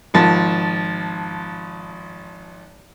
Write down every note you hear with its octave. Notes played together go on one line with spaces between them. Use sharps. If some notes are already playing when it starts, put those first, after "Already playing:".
G#1 F3 A5